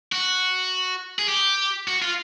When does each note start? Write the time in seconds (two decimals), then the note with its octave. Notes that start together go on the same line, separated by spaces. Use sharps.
0.12 F#4
1.19 G#4
1.28 G4
1.88 F#4
2.02 F4